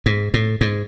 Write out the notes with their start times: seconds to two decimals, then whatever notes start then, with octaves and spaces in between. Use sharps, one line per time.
0.06 G#2
0.34 A2
0.61 G#2